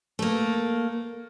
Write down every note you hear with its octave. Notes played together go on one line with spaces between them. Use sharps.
A3 A#3